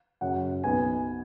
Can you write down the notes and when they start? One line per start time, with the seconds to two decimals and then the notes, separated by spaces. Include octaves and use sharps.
0.21 F#2 C#3 F#3 C#4 F#5
0.64 B1 B2 B3 G#5